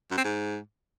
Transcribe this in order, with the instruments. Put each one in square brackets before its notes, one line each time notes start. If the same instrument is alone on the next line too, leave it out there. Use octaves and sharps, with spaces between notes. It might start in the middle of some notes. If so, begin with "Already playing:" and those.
[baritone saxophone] F#2
C4
G#2